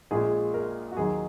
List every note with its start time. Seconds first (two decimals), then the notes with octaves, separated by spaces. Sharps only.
0.11 A#1 A#2 G#3 G#4
0.54 A#4
0.92 F#4
0.97 D#2 D#3 F#3 G#4